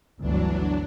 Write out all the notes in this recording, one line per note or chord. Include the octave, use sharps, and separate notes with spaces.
G1 D2 E3 F#3 D4